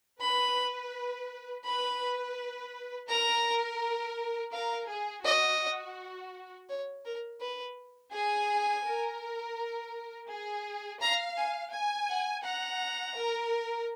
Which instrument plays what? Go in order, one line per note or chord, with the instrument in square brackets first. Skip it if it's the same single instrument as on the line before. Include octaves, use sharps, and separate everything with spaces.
[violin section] B4 [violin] B5
[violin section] B4 [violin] B5
[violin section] A#4 [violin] A#5
[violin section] A#4 [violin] F5
[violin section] G#4
[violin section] F#4 [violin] D#5
[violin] C#5
A#4
B4
[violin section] G#4 [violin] G#5
[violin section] A#4
G#4
[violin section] F5 [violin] A#5
[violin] G#5
[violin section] G#5
[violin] F#5
[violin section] F#5 [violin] A#5
[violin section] A#4